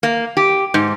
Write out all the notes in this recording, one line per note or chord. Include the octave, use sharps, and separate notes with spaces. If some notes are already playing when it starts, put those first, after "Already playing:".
A#3
G4
G#2